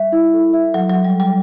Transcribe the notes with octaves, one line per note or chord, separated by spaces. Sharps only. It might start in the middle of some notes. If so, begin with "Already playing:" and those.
Already playing: G3 E5
E4
A4
E5
F#3 A4
F#3 A4
G3
G3 A4